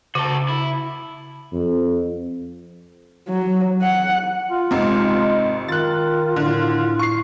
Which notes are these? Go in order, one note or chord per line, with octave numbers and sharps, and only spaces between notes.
C#3 F#4 A4
E4
F2
F#3
F#5
F4
G#1 C3 G#3
D#3 F4 F#6 A6
A2 D3
C#6 C7